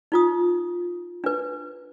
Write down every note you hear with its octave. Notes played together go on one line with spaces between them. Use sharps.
D#4 F4 D#6
D4 B4